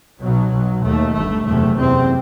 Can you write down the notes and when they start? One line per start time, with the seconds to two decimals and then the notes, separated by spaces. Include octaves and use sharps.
0.22 B1 B2 F#3
0.52 B1 B2
0.83 D#2 A3
1.14 G1 G2 A3
1.46 F#1 E2 C3 A3
1.77 F#1 E2 C3 C4